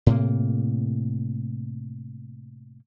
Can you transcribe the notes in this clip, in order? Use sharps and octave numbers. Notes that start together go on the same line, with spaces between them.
A2 C3 A#3